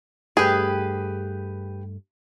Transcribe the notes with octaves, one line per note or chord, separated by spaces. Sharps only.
G2 A3 D4 G4 G#4 B4